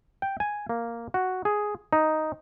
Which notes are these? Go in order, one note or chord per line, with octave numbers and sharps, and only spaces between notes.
G5
G#5
A#3
F#4
G#4
D#4